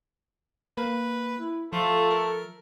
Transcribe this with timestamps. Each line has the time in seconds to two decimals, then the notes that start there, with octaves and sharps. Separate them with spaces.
0.77 A#3 B4
1.38 E4
1.73 F3 A3 F4 A4
2.10 A#4